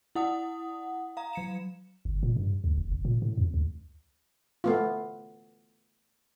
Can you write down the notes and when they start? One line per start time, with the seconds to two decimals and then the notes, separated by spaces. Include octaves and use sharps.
0.15 E4 F#5 D#6
1.17 F5 A#5
1.33 F#3 C#7 E7
2.05 G1
2.23 A#2
2.36 G2
2.64 D2
2.78 F1
2.92 F#1
3.05 A#2
3.22 A2
3.37 F2
3.54 D2
4.64 A3 B3 F4